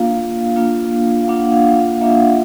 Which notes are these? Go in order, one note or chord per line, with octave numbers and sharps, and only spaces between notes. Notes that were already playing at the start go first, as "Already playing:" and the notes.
Already playing: A#3 D4 F4 F5
A#3 D4 F4
F5
A#3 D4 F4 F#5
F5
F5
A#3 D4 F4 E5
F5
F#5